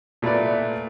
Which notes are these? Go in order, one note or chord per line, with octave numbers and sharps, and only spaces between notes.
A#2 A3 E4 B4 D5